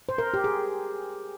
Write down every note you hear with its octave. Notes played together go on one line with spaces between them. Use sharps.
C5
A#4
G4
G#4